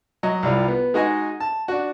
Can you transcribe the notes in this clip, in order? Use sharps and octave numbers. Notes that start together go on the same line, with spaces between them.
F#3 D#5
C2 G3 F4
B3
G#3 D#4 F#4 D#5 G#5
A5
D4 F#4